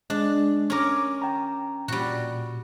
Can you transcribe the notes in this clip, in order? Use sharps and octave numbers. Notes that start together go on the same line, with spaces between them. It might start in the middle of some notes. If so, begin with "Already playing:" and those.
G#3 D4
C#4 A#4 C#6 D6
G5 A#5
A#2 G3 F#4